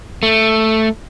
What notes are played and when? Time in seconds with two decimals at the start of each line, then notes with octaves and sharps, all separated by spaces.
0.23 A3